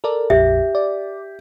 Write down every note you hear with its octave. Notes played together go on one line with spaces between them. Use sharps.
A4 A#4 D5
A#1 F2 G4 E5
D5